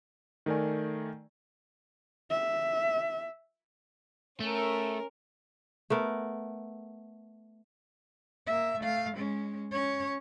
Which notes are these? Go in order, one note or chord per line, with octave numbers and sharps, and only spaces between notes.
D#3 A3 A#4 D5 G#5
E5
A3 C#4 A#4
A3 B3 A#4
A#3 E5
A3 F5
G#3 C#4
C#4 C#5